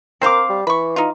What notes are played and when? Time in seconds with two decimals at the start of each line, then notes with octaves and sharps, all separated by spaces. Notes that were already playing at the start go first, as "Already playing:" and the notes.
0.22 C4 A#4 C5 F5 D6 C7
0.50 G3
0.67 E3 B5 C#6
0.96 D#4 F4